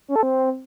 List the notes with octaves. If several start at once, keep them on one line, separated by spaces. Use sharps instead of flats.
C#4
A4
C4